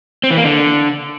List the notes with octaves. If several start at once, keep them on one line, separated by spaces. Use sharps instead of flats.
C4
E3
A#3
D3